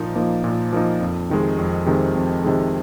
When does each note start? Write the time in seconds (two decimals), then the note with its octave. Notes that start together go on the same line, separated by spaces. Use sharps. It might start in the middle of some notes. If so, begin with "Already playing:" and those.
Already playing: A#2 F3 A#3 D#4
0.15 F3 A#3 D#4
0.44 A#2
0.73 F3 A#3 D#4
1.01 F2
1.29 C3 D#3 G#3
1.58 F2
1.86 C3 D#3 G#3
2.15 F2
2.44 C3 D#3 G#3